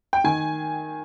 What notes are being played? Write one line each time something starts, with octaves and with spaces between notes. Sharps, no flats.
G5
D#3 G#5